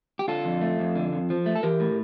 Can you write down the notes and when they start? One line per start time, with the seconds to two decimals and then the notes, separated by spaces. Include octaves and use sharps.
0.19 G4
0.28 D3 F4 A4
0.45 F2
0.61 A3
0.79 F2
0.95 D3
1.13 F2
1.30 F3
1.46 A3
1.55 A4
1.63 E3 G4 A#4
1.80 A2